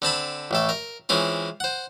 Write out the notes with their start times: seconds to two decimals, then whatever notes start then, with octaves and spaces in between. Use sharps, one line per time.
0.02 D3 C4 A5 B5
0.51 A1 A2 A4
0.69 A#4
1.09 E3 G#3 C4 C#4 F4
1.60 C5 F#5